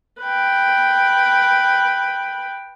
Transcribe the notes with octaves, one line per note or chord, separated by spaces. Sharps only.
B4 G5